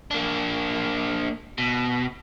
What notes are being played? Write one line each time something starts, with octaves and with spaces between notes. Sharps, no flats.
A#3 D4
B2